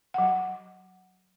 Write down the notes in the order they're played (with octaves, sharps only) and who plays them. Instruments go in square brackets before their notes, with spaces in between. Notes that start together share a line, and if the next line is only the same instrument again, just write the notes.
[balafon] F#3 F#5